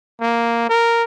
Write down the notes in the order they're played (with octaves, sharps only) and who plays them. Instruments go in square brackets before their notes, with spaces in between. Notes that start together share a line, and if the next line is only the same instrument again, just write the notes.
[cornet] A#3
A#4